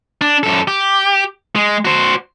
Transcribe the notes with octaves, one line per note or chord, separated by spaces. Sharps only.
D4
F#2 A4
G4
G#3
F#4 C5